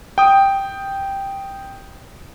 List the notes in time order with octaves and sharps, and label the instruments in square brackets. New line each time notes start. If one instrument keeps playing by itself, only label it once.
[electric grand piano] G5 D#6